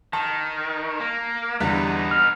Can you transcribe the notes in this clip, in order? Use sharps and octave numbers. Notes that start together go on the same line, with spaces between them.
D#3 A5
A#3
E2 D3 G3 B3 D#4
F6